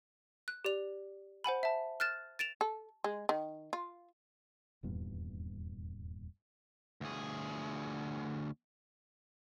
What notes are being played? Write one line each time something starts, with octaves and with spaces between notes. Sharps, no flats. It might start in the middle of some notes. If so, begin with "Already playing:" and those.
F#6
G4 D5 F7
C5 F#5 G#5 B5
E5 A5
F6 F#6 A6 E7
A6 D7 E7 F7
A4
G#3
D#3
F4
D#1 E2 G2 A#2
D2 G#4